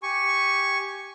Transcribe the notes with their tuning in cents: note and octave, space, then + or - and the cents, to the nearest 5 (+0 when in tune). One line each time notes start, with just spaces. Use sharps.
G4 +0 G#5 +0 C#6 +0